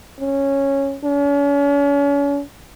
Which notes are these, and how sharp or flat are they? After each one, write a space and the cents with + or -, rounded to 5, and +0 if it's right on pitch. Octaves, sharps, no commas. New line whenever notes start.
C#4 -10
C#4 +40